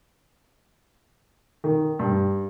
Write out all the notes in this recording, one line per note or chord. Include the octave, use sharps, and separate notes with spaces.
D#3
G2